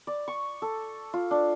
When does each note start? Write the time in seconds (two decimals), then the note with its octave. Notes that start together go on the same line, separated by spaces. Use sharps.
0.07 D5
0.28 C#6
0.62 A4
1.14 F4
1.31 D4